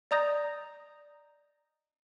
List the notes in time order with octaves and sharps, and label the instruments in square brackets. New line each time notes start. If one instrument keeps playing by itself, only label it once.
[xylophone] D5 D#5 A#5 D#6 G6 A#6